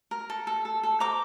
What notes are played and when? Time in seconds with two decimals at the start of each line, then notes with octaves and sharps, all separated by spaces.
0.11 A#4
0.30 A4
0.47 A4
0.65 A4
0.83 A4
1.00 C5 A#5 D6